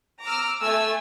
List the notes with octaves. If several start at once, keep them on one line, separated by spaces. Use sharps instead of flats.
A#5 D6 E6 F6
A3 G#5 E6